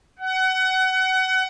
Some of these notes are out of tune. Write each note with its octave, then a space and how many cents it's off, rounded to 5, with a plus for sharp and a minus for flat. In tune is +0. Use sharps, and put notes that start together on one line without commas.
F#5 +25